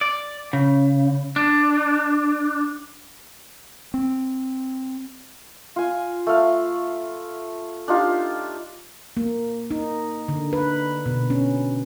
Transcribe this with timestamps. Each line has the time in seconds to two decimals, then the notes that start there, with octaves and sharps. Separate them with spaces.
0.01 D5
0.53 C#3
1.36 D4
3.94 C4
5.76 F4 G#5
6.27 A3 F5
7.88 D4 D#4 F4 G4
9.17 A#3
9.71 D#4
10.28 D3
10.53 B4
11.06 B2
11.30 C#4